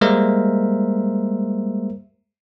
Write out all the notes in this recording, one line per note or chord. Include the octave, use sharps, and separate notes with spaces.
G3 G#3 A#3 A#4 C5 E5